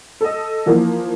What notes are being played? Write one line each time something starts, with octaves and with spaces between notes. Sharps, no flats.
A4 D#5
E3 F3 A#3